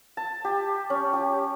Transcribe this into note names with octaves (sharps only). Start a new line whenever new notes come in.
A5
G4
C#4
G4